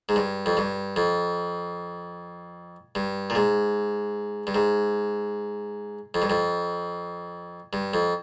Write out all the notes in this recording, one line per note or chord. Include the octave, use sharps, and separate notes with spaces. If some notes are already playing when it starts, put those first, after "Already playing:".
G#2
G2
F2
G2
F2
G2
A#2
G#2
G2
G#2
F2
G2
F2
G2
F2